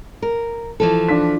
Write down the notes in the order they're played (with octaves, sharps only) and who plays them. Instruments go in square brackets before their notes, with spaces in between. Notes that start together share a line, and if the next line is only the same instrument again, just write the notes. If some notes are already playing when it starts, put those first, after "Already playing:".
[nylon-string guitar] A#4
E3 F3 A4
[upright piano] D4 F4 B6